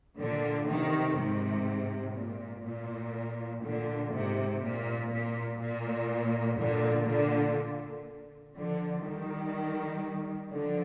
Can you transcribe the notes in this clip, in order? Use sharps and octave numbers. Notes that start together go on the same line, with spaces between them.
A#2 D3
C3 D#3
G#2 C3
A#2
A#2
A#2 D3
G#2 C3
A#2
A#2
A#2
A#2 D3
A#2 D3
D3 F3
D#3 G3
D3 F3